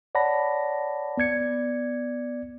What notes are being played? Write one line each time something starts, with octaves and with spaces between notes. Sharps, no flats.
C#5 D5 F#5 A5 B5 A#6
B3 D5 G#6 C#7